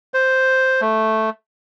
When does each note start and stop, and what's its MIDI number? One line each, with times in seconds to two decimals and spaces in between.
0.14 0.81 72
0.81 1.30 57